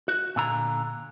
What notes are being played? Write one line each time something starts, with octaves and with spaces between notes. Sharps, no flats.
F#4
A#2 D3 A#5